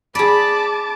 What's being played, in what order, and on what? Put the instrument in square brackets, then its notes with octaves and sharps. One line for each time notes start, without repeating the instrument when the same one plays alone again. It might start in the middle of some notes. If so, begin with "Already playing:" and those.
[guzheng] G#4 D5 [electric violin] A5 D6 [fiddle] B5